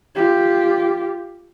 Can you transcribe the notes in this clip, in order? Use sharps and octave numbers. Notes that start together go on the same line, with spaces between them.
F4 G4